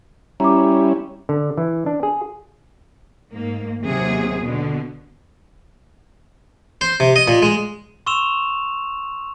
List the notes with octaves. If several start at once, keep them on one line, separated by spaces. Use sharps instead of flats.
G3 C#4 E4 A#5 D6
D3
E3
D4
G#4
G#2 A#3
D#2 C3 F#3 G#4
B2 D3
C5
C3
D#5
A#2
G#3
C6 C#6 E6 E7 F7